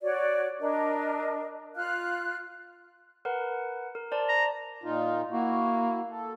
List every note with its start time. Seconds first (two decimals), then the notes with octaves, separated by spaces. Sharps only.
0.01 F#4 C#5 D5
0.60 D4 A#4 D#5
1.75 F4 F5 F6 F#6
3.25 A#4 B4 F#5
3.95 A#4
4.12 C5 D5 A5
4.29 A#5
4.84 A#2 D#4 F4
5.31 A#3 E4 F#4
6.10 A4